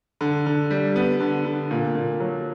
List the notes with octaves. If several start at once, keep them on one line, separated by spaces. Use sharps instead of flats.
D3
D3
G3
B3
D3
D3
A#2
A#2
F#3